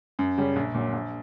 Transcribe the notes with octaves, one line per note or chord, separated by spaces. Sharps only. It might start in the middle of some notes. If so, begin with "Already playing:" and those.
F#2
C#3 G3 C#4 G4
A#1
A#2 F#3
A#1